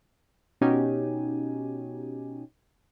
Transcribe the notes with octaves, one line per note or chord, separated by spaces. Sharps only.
B2 C#4 D#4 F#4 G4 G#5